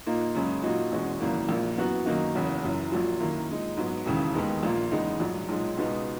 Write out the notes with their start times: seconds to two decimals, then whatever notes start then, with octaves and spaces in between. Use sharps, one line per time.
0.06 A#2 A#3 D#4
0.35 F#2 C#3 G#3 C#4
0.63 A#2 F#3 A#3 D#4 F#4
0.92 E2 B2 G#3 C#4 F#4
1.21 G#1 F#2 C#3 E3 A#3
1.49 A#1 A#2 A#3
1.77 F#2 E3 B3 F#4
2.06 F#2 D#3 A#3 D#4 F#4
2.35 F#1 E2 C#3
2.63 F#1 F#2 E3
2.92 A#1 A#2 F#3
3.20 F#2 D#3 A#3 E4
3.49 A#2 G#3 D#4
3.77 G#2 F#3 B3
4.06 E1 D#2 C#3 E3
4.34 D#2 D#3 G#3 B3
4.63 A#1 A#2 A#3
4.92 E2 C#3 G#3 D#4
5.20 A#1 G#2 F#3
5.49 B1 A#2 G#3 D#4
5.77 C#2 B2 G#3 B3 D#4